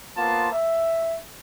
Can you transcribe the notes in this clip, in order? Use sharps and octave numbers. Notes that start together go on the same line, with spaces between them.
A#3 B3 F4 C5 A5
E5